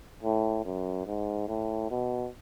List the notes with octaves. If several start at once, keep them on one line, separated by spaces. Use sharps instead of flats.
A2
F#2
G#2
A2
B2